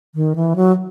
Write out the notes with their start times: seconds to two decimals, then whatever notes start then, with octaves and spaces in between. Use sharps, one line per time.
0.15 D#3
0.36 E3
0.56 F#3